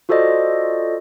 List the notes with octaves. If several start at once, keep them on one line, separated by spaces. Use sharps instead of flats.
F4 F#4 A4 C5 D5 D#5